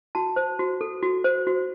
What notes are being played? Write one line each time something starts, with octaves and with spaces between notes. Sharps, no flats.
F#4 A5
C5
F#4
A4
F#4
C5
F#4